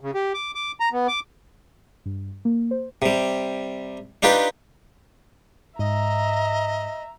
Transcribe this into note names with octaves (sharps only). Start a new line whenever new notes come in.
C#3
G4
D6
D6
A#5
B3
D6
G2
A#3
C5
C3 G3
D4 D#4 F4 G4 B4
G#2 D#5 E5 A#5